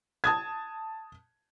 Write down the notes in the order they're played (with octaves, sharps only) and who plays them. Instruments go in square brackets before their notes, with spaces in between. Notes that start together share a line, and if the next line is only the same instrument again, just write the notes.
[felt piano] A5 D#6 G#6